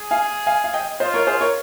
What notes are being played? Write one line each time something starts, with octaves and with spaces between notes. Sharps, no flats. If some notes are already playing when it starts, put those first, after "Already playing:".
Already playing: G#4
F5 G#5
F5 G#5
F5
D#5 G5
F4 C5 D#5
A#4 C#5
G#4 C5
A#4 C#5